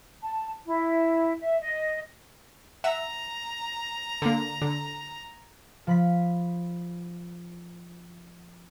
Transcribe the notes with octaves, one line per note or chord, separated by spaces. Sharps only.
A5
E4
E5
D#5
E5 F#5 A#5 E6
D3 A#3
D3
F3 B5 B6